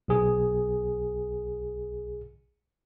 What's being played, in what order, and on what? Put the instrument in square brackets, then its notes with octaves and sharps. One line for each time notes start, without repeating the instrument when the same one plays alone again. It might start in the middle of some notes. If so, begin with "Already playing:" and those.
[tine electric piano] B1 G#4